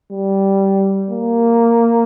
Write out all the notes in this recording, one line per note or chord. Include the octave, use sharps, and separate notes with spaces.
G3
A#3